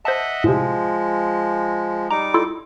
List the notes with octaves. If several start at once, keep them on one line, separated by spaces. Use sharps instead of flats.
C5 D#5 E5 F#5 A5
A2 C3 F3 G#3
G3 D#4 A#5 D6
E4 F4 A4